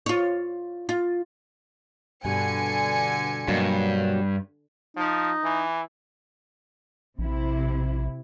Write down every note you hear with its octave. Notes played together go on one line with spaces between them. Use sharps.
F4 C#5
F4
G2 B2 D3 G#5 C#7
G2 B2 F#3 A#3
F3 D#4
E3
A#1 C3 E4